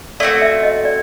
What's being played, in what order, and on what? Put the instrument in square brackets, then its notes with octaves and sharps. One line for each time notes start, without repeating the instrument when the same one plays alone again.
[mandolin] A3 C4 D#4 F#4 [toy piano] D5
[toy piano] E5
D#5
D5